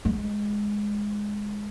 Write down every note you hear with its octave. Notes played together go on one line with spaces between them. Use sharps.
G#3